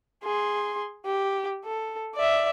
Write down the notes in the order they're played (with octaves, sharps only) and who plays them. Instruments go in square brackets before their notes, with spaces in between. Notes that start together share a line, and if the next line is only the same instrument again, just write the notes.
[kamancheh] G#4 C6
G4
A4
D5 E5